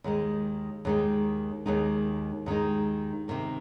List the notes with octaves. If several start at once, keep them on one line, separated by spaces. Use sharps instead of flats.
D#2 D#3 G#3 D#4
D#2 D#3 G#3 D#4
D#2 D#3 G#3 D#4
D#2 D#3 G#3 D#4
C3 D#3 A#3